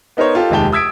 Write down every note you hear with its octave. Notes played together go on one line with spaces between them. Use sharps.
B3 D#4 A#4 C5 C#5
F4 G4 A4
F1 D#2 G#3 G4 A5 G7
D#6 E6 G#6 B6 D7